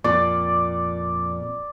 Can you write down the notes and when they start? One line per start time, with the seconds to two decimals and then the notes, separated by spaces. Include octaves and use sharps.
0.04 F2 A#2 D5